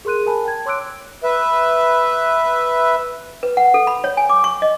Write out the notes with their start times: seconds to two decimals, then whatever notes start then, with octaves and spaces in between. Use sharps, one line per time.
0.05 G#4 A#4 C6 F#6 D#7
0.26 A#4 G#5 A5 B5
0.45 G5 A5 G#6
0.66 C#5 C6 D6 E6 F#6 D7
1.24 B4 E5
3.43 B4
3.57 F#5
3.74 A4
3.87 B5
4.04 C#5
4.17 G#5
4.30 D6
4.44 C#6
4.62 D#5